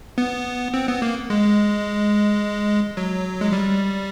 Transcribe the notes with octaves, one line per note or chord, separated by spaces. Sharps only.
B3
C4
B3
A#3
G#3
F#3
G#3
G3